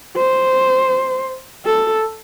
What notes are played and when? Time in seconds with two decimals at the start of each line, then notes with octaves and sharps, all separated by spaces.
0.17 C5
1.66 A4